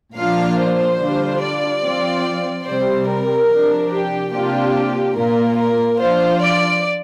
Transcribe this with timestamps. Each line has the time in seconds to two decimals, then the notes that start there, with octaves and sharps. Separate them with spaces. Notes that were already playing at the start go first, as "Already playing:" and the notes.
0.16 A#2 F3 A#3 D4 F4 F5
0.58 C5
0.99 D3 G3 D4 F4
1.41 D5
1.82 F3 C4 F4
2.65 C3 G3 C4 C5
3.08 A#4
3.49 C3 F3 D4
3.90 G4
4.32 C3 A#3 D4 F4 G4
5.15 A#2 A#3 F4 A#4
5.57 A#4
5.99 F3 D4 F4 C5
6.40 D5